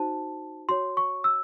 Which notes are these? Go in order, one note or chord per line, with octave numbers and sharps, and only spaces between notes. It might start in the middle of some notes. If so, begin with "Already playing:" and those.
Already playing: D#4 F#4 C5 A5
F#4 C#5 C6
C#6
E6